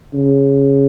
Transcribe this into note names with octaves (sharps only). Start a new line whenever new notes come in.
C#3